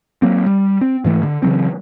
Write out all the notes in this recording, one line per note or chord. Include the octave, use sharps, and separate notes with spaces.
F#3 A#3 C4
G3
C4
G#2 E3 A3
D3
C#3 E3 F#3 C4